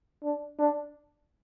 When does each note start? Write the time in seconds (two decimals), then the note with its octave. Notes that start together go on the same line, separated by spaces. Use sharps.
0.23 D4
0.58 D4